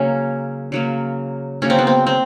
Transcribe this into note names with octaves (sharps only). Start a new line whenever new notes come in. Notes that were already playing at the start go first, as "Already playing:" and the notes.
Already playing: C#3 F#3 A#3 C#4
C#3 F#3 A#3
C#3 F#3 A#3 C#4
C4
B3
C4
C4